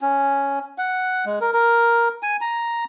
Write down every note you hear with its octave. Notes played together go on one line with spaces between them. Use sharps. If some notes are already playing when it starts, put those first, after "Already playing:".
C#4
F#5
G#3
A#4
A#4
G#5
A#5